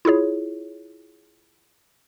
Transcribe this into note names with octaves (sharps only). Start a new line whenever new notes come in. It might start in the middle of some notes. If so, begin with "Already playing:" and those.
E4 F4 G#4 C#5